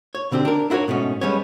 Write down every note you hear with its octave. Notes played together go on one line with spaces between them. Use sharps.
C#5
B2 D3 C4 D4 G4
D4 A#4
D4 E4 F#4 A#4 C#5
G#2 B2 A3 C#4
G3 G#3 B3 C#4 C#5